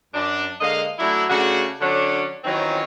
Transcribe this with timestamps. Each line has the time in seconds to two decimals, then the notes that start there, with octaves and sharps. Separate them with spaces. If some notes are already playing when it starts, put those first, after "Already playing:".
0.14 F#2 D4
0.61 D3 G#3 A#3 D#5 F5
0.99 F#3 A3 D4 E4
1.30 C#3 A3 D4 F#4
1.81 D3 F#3 C#4 D4
2.44 D#3 E3 F#3 C4 C#4 F4